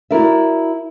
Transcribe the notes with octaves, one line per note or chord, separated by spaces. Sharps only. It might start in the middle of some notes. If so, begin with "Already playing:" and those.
E4 F#4 A#4 D5 E5